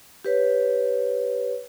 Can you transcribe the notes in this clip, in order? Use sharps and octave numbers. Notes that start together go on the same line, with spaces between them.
G4 B4 C#5